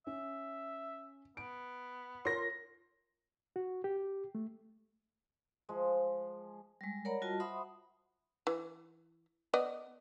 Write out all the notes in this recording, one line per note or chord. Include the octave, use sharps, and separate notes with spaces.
C#4 E5
B3 D7
F4 A#4 C#5 C6 A#6
F#4
G4
A3
F3 G#3
G3 G#3
A#4 C#5 D5 F#5 A#5 B5
G3 F4 F#4 D#5 A5
C5 E5 F#5 B5 C6 D#6
E3
B3 D5 D#5